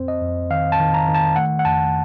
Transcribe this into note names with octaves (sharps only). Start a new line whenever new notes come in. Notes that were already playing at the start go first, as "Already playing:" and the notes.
Already playing: F2 C4 C5
D#5
F2
D#3 F5
A5
D#3
A#5
D#3
A5
A3 F#5
F#5
F2 A5